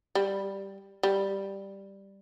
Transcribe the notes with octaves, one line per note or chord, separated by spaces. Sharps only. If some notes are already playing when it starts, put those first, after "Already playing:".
G3
G3